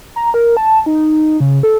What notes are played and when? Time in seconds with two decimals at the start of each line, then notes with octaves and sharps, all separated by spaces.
0.16 A#5
0.34 A#4
0.57 A5
0.86 D#4
1.40 C#3
1.63 A4